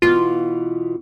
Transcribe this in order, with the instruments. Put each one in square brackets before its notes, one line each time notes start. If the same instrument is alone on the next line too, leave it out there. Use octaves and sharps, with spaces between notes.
[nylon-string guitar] B2 E3 [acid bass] F4